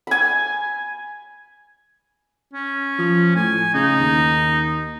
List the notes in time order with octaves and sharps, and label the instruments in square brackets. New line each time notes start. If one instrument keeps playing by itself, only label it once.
[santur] G#5 B5
[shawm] C#4
[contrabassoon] F3
[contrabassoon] A2 [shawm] G#5
[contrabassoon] C#3 [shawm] D#4
[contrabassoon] D#2